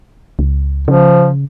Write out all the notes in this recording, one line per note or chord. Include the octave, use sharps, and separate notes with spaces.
C#2
C#3 F3